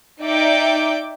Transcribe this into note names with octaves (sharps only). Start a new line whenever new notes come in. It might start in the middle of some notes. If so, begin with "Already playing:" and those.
D#4 D5 E5 G5 D6